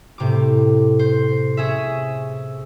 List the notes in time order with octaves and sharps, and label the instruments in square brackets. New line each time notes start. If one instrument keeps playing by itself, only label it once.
[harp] A2 C3 D6
C5
C#4 G#4 E5